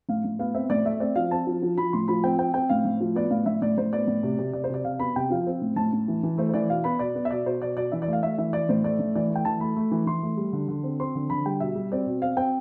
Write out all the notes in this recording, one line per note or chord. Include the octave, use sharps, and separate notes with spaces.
A2 F5
A2
B3 F5
C4 E5
A2 D5
A3 E5
C4 D5
F3 F5
C4 A5
F3
F3
F3 B5
A2 C6
F3 B5
C4 G5
C4 G5
C4 G5
A2 F5
A2
F3
B3 D5
A2 F5
A2 E5
A2 D5
A2 C5
B3 D5
A2
C3
C3
C3 D5
C5
C3 D5
C3 F5
B3 B5
C3 G5
F3 F5
C4
A2
A2 A5
A2
E3
E3
A3 C5
C5
E3 D5
B2 F5
B3 B5
B2 D5
B3
E5
B2 D5
B2 C5
B2 D5
B2 D5
E3 E5
D5
A3 F5
A3 E5
E3 E5
E3 D5
A2 C5
A3 D5
A2
E3 D5
A3
G5
E3 A5
A3 B5
A3
E3
E3 C6
A3
G3
D3
D3
C4
C4 C6
D3
D3 B5
G3 G5
B2 E5
G3
C4 D5
B2
C4 F5
C4 G5